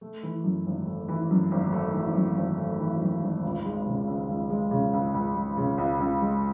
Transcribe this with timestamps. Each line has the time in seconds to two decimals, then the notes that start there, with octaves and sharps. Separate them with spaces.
0.01 A3
0.23 E3
0.44 F#2
0.66 G#1
0.86 A3
1.08 E3
1.30 F#2
1.51 G#1
1.72 A3
1.94 E3
2.15 F#2
2.37 G#1
2.58 A3
2.80 E3
3.01 F#2
3.22 G#1
3.44 C#2
3.65 G#3
3.87 C#3
4.07 C#2
4.28 C#2
4.50 G#3
4.71 C#3
4.93 C#2
5.14 C#2
5.35 G#3
5.57 C#3
5.78 C#2
5.99 C#2
6.21 G#3